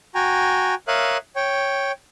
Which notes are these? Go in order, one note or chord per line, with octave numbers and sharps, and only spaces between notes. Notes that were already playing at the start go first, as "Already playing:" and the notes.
F#4 G5 G#5 A#5
A#4 C#5 E5 F5 D#6 F#6
C#5 G5